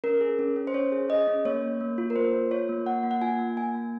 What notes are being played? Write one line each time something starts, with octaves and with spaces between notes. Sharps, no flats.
C#4 A#4
G#4
C#4
C#4
C5
C#4 C#5
G#4
G#4 D#5
C#4
A#3 C#5
A#3
A#3
F4
A#4
A#3 C5
F4
F4 C#5
A#3
A#3 F#5
A#3
F#5
F4 G#5
A#3
A#3 G#5
A#3